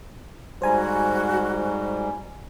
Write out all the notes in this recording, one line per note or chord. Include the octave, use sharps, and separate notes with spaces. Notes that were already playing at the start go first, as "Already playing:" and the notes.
G#2 G3 F#4 C5 G#5 A#5